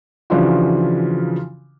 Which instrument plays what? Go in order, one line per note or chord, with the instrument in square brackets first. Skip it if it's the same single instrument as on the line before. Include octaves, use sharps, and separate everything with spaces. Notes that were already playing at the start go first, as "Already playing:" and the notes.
[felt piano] C#3 E3 F3 D4 F4 F#4